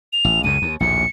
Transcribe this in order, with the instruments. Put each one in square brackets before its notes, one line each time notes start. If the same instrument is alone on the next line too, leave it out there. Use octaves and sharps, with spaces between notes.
[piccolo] F7
[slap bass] A1
[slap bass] C#2 F#2 C#3 [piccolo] D#7
[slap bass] D#2
[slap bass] A#1 D#2 A2 [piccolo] C#7